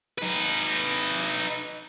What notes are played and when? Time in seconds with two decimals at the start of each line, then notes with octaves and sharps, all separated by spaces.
0.18 D#4 B4